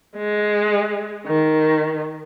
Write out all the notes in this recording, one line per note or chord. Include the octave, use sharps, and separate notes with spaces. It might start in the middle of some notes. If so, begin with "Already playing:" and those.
G#3
D#3